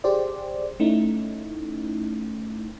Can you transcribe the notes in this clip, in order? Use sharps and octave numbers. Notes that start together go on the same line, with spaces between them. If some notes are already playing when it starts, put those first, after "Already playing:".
G4 G#4 C5 D5
A3 C#4 D#4 E4